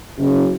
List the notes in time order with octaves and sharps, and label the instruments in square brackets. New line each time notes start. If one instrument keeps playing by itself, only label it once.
[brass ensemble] F#1